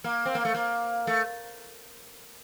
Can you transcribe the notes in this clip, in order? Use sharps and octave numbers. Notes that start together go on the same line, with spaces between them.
A#3
C4
A#3
A3
A#3
A3